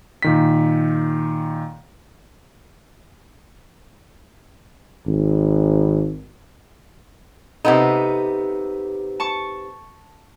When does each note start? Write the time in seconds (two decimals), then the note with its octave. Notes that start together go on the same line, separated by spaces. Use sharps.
0.22 A#2 D#3 B6
5.07 G#1
7.65 C3 B3 D#4 A4
9.20 A5 C#6